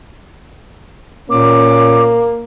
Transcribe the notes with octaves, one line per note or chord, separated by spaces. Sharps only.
A#2 A#3 C#4 D6